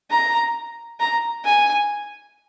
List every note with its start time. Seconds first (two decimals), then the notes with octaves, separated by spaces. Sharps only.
0.10 A#5
1.00 A#5
1.45 G#5